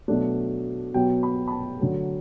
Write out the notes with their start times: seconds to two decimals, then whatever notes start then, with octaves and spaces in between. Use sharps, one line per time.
0.08 B2 F#3 A3 D4
0.94 B2 F#3 B3 G5
1.23 B5
1.48 B5
1.51 A5
1.79 D3 F#3 A3